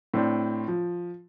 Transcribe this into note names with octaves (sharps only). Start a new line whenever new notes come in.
A2 C4 D4
F3